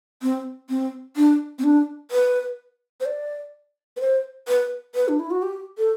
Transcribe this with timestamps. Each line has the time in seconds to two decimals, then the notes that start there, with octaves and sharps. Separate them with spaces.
0.22 C4
0.69 C4
1.16 D4
1.59 C4
1.64 D4
2.11 B4
3.00 C5
3.06 D5
3.97 B4
4.00 C5
4.48 B4
4.95 B4
5.08 D4
5.19 E4
5.31 F#4
5.42 G4
5.78 A4